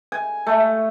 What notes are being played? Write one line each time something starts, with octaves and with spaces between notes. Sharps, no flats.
G#5
A3